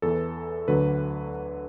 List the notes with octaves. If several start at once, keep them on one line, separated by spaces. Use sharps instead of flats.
E2 E3 A4
D2 D3 F#3 B4